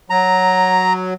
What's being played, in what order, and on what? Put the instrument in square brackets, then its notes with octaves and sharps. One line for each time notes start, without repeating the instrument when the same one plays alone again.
[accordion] F#3 [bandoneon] A#5